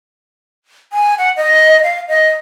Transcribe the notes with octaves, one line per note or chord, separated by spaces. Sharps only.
G#5
F#5
D#5
F5
D#5